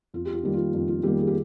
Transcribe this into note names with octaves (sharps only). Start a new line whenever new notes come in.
F2 F4
G4
F4
D#3 G3 A#3 G4
F4
F2
F4
D#3 G3 A#3 G4
G#4
G4